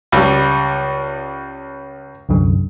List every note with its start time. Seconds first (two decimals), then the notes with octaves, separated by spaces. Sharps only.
0.12 C#2 G3
2.29 C2 F#2 D3